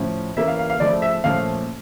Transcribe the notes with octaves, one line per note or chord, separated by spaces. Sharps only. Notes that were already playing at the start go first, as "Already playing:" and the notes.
Already playing: A2 F3 C#4
E3 A#3 C#4 E5
F5
F5
F5
C#3 F3 A3 D5
E5
A#2 F3 A3 C#4 F5